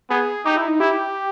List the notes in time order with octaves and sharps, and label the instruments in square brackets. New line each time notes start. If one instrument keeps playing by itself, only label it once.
[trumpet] B3 [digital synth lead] G#4
[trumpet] D#4 [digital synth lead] G4
[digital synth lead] E4
D#4
[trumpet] E4 [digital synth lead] G4